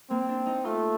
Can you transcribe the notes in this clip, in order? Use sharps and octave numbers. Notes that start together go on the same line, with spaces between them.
A#3 C4
D4
D#4
A3 F4